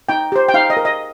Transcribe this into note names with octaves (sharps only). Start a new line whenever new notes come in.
D#4 G5
G4 C5
G5
D#4 F5
D#5
A#4
D#5